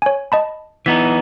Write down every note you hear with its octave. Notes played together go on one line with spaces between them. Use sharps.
C#5 G#5
D#5 A5 B5
E3 B3 D#4 B6